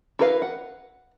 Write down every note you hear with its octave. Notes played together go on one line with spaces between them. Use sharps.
E4 F#4 A#4 B4 F5
F#5